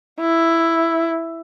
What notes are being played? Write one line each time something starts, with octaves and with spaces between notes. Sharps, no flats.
E4